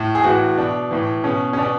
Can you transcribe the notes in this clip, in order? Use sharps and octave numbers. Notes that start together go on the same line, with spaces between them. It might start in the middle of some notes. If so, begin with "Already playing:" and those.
Already playing: A2
G#4
A2 E3 F#4
B2 D4
A2 E3
B2 C#4
C#4
B2 D4